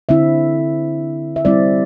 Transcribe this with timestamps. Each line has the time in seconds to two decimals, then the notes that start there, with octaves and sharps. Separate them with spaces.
0.09 D3 C4 E4 E5
1.36 E5
1.45 G3 C4 E4 D5